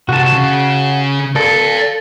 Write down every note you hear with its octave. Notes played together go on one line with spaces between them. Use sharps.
C2 F#4 A5
C#3
A4 D5 F5